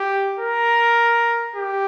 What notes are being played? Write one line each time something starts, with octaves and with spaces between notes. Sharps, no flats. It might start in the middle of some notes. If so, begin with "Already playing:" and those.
Already playing: G4
A#4
G4